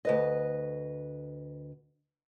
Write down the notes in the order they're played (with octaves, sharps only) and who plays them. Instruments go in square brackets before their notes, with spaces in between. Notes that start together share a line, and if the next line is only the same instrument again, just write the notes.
[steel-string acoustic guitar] D2 B4 D#5